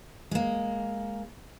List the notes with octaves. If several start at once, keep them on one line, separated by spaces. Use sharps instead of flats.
G#3 A#3